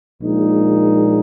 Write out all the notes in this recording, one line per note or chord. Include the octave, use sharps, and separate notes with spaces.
A#1 A#2 G#3 D#4